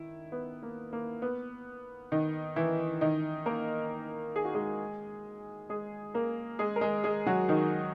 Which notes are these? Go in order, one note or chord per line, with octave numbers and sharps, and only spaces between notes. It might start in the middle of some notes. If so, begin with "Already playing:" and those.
Already playing: D#3 E4
B3
A#3
A#3
B3
D#3 D#4
E3 E4
D#3 D#4
A#3 A#4
G#4
F#4
G#3 G#4
G#3 G#4
A#3 A#4
G#3 G#4
A#4
G#3 G#4
G#3 G#4
F#3 F#4
D#3 D#4